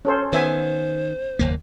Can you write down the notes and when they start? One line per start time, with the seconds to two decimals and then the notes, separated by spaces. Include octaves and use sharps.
0.05 C#4 A4 C5
0.33 D#3 B3 C5 E5 G#5
1.39 F#1 D#2 A#3